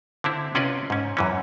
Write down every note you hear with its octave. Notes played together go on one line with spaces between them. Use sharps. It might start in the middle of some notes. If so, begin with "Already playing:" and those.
D3 C4 E4
C3 C#4 F4 B4 D5 D#5
G#2 C#4
F#2 E3 C#4